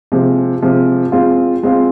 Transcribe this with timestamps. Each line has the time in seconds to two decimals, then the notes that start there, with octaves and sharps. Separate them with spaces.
0.12 C3 F3 G#3
0.62 C3 F3 G#3
1.12 G#3 C4 F4
1.63 G#3 C4 F4